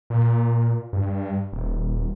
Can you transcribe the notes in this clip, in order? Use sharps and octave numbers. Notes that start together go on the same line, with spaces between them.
A#2
G2
D#1